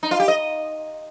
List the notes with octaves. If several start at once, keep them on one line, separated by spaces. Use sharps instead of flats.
D#4
F4
G4
D#5